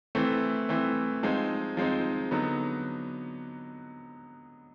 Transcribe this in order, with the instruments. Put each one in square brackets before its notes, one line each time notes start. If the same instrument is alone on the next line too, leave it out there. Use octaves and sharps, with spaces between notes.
[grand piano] E3 A3 C4
E3 A3 C4
F3 G#3 C4 D#4
F3 G#3 C4 D#4
D3 F#3 B3 D#4